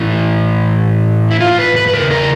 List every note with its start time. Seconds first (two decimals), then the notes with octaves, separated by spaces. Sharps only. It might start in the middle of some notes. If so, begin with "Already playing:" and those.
Already playing: A2 E3
1.31 E4
1.40 F4
1.58 B4
1.76 B4
1.88 B4
1.94 E2 C#3 E3 A#4
2.11 A#4